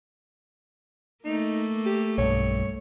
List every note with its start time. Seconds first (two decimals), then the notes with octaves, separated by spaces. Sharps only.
1.25 A3 A#3 D#4
1.86 G4
2.18 B1 G2 C#5